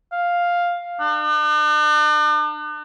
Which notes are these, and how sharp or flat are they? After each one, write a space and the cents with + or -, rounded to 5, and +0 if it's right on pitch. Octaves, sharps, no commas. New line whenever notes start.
F5 +5
D4 +45